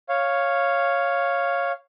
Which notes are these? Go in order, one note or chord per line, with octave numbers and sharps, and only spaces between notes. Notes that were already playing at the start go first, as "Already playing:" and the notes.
C#5 F5